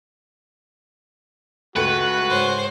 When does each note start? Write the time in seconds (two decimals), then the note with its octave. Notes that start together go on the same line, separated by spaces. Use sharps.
1.76 C#2 A3 F#4 B4 C#7
2.28 G#2 C5 C#5